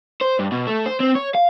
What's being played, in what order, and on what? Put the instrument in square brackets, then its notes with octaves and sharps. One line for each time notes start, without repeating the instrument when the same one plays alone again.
[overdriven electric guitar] C5
G2
B2
A3
C5
C4
C#5
F5